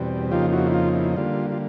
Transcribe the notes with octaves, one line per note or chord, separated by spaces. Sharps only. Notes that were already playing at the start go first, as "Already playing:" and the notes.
Already playing: E2 B2 G3 C4
F2 C#3 F3 A#3 D#4 F4 G4
E4 F#4
E4
F4
E4
D3 G3 A#3 F4
F4